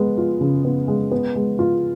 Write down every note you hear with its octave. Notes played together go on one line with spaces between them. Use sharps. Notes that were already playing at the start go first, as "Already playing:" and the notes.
Already playing: G#3 B3
F4
C#3
B3
G#3
B3
G#3
F4